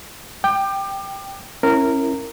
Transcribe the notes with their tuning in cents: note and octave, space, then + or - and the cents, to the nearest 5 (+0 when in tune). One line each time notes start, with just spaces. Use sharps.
G5 +0 D6 +30
C#4 -30 E4 +0 A#4 -10